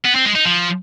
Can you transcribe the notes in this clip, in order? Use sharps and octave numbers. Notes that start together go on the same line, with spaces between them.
B3
C4
G#3
D#4
F3